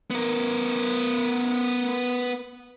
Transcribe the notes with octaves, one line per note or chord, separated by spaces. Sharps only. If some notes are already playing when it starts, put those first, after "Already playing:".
B3 A#4